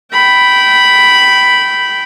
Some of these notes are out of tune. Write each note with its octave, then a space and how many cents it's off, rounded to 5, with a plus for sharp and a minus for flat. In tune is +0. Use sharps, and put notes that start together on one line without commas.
G5 -20 B5 +0